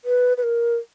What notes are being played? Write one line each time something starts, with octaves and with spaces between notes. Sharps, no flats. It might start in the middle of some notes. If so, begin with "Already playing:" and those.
B4
B4
A#4